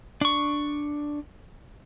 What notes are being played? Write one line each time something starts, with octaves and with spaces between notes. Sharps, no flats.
D4 C#6